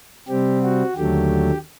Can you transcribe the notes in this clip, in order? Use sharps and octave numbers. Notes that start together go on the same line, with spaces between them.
C3 G3 C4 G4
F#4
D#2 D3 F#3 A3 G4